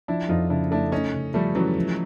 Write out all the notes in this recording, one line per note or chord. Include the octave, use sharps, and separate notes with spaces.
F3 D4 E4
F2 D#4 F4
C#3 D4 E4
A3 D4 E4
A3 C#4 D#4
C#3
F3 G3 A3
E3 F#3 C#4
F3